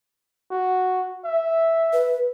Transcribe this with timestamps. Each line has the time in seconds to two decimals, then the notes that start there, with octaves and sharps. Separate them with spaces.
0.51 F#4
1.25 E5
1.93 B4